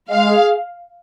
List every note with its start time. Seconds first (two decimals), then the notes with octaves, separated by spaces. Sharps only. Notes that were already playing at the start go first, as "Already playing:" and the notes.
0.09 G#3 F5
0.27 G#4